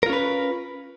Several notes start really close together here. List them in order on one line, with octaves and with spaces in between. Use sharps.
A#4 F4 C#4 B4